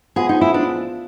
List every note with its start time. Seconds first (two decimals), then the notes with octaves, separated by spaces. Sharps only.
0.16 F3 G#3 B3 G#4
0.29 D#4
0.41 E4
0.54 D4